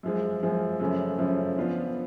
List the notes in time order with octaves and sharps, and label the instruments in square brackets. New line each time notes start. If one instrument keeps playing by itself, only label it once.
[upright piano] F#2 F3 G#3
F#2 F3 G#3
F#2 C#3 F3 A3 C#4
F#2 C#3 F3 A3 C#4
F3 B3 D4 F4